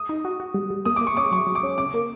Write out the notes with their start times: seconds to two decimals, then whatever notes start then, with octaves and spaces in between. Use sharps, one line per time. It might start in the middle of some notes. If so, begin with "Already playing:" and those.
Already playing: D#6
0.09 D#4
0.25 F#4
0.40 F#4
0.54 G3
0.70 G3
0.85 A#3 D#6
0.96 A#3 D6
1.07 C#6
1.17 C#4 D6
1.32 F#3 C#6
1.47 F#3
1.55 D6
1.63 C#4
1.78 C#3 D6
1.94 A#3